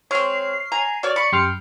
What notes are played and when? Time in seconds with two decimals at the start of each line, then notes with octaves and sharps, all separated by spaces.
0.11 G#3 C4 C#5 F6 C7
0.72 G#5 A#5
1.03 F#4 C#5 D5 F6
1.16 B5 C#6 C#7
1.32 F#2 G4 C6 F6